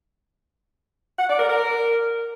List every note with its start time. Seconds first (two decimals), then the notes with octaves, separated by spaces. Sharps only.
1.19 F#5
1.29 D5
1.39 A#4
1.49 A#4